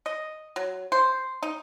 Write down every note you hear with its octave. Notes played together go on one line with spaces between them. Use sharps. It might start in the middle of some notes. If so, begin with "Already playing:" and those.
D#5
F#3
C5
D#4